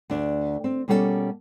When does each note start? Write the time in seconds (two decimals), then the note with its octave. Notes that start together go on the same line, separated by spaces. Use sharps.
0.10 D2 D4
0.64 C4
0.88 B2 G3 A#3 C#4 G#4 A4